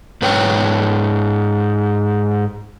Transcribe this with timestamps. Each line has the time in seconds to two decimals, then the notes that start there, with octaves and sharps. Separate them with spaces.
0.22 G#2 B4 C#5 G5